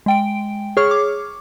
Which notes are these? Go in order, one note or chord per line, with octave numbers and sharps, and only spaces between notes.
G#3 G5 D7
G#4 C#5 C#6 F6
D6